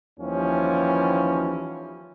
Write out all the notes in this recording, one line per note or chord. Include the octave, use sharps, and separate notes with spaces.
D#2 E3 F3 G3 C#4